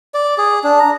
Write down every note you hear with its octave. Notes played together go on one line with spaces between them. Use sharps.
D5
G#4
D4
A#5